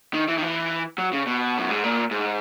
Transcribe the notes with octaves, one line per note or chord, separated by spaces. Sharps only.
D#3
E3
D#3
E3
F#3
C#3
B2
F#2
G#2
A#2
G#2